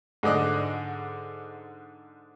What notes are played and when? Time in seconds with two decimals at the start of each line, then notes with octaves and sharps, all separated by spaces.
0.23 G#2 D3 D5 D#5 F#6